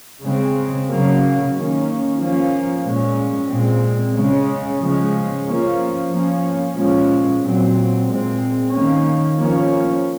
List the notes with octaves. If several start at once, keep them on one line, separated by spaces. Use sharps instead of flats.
C#3 G#3 C4
C#3 F#3 A#3 C#4
D#3 A#3 C#4
F3 A#3 C#4
A#2 G#3 C#4
A#2 G#3 C4
C#3 G#3 C#4
C#3 F3 G#3 C#4
F3 A#3 C#4
F3 A#3 C#4
A#2 F3 G#3 C#4
A#2 F#3 C4
A#2 G#3 C4
D#3 A#3 C#4
F3 A#3 C#4